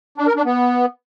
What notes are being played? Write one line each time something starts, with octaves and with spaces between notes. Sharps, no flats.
D4
A#4
D4
B3